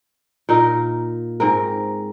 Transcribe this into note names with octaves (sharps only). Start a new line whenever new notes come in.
A#2 D#4 A#4
G#2 C4 A#4